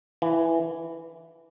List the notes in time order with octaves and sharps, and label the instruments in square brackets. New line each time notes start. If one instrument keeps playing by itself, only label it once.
[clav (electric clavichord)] E3